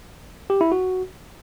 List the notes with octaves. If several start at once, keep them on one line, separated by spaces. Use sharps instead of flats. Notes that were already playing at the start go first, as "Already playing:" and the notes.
G4
E4
F#4